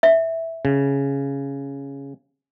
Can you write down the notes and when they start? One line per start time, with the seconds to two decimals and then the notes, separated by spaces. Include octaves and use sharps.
0.03 E5
0.65 C#3